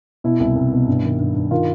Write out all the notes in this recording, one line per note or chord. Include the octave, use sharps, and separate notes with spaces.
B2 E4
C2
C2
B2
G2
D#3
G2
G2
D#3 F4